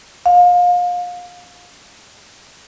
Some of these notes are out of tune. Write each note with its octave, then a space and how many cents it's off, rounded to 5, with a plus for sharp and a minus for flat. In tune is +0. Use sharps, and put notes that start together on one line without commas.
F5 +30